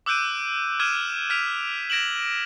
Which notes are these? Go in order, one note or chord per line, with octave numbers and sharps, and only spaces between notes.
D6 E6 F#6 G6 D7 D#7
D6 E6 F6 G#6 D#7 E7
F6 G#6 B6 D7 F7
G#6 A#6 D7 E7 F#7